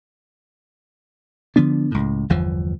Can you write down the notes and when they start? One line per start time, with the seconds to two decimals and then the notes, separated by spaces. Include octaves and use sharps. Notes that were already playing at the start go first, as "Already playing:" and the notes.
1.56 D3 F3 B3 D4
1.91 C#2 A2
2.29 G1 E2 E3 F3